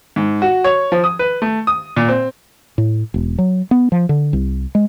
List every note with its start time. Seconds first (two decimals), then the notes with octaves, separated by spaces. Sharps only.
0.16 G#2
0.42 F#4
0.64 C#5
0.92 F3
1.04 D#6
1.19 B4
1.42 A3
1.67 D#6
1.96 A#2
2.08 C4
2.78 A2
3.14 E1
3.39 F#3
3.71 B3
3.92 F3
4.09 D3
4.33 C2
4.75 G#3